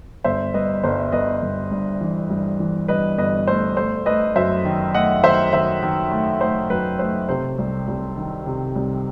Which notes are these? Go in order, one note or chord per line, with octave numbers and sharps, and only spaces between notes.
G1 C5 E5
G2 B4 D#5
G1 C5
G1 B4 D#5
G1
G2
E3
G2
E3
G2 B4 D#5
G1 B4 D#5
A3 C5
A3 C5
A3 B4 D#5
F#2 C5 E5
D#3
A3 D#5 F#5
D#3 C5 E5
D#3 C5 E5
D#3
A3
A3 C5
F#2 B4
A3 C5
C3 C5
C2
C2
D#3
C3
C2